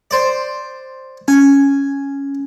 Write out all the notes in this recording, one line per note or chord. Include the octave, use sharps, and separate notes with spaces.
C5 D5
C#4 G#5